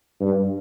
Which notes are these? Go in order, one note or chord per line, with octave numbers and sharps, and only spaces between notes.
G2